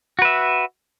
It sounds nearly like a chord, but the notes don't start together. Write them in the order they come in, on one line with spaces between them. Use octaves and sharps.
F#4 B4 E5